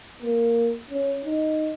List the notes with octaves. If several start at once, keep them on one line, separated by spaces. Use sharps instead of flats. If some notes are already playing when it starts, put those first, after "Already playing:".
A#3
C#4
D#4